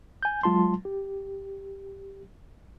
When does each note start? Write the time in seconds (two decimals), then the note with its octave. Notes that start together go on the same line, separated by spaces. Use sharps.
0.23 G#5 G6
0.43 F#3 G#3 F4 A5 C6
0.85 G4